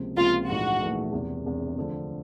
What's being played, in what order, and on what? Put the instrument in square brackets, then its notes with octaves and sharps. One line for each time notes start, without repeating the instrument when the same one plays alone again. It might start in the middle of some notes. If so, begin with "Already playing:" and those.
Already playing: [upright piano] C#2 C3 F3 A#3
[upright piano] C#2 C3 F3 A#3 [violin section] F4
[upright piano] A#1 G#2 E3 A3 [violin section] F#4
[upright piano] A#1 G#2 E3 A3
E1 E2 C3
E1 E2 C3
D2 D3 F3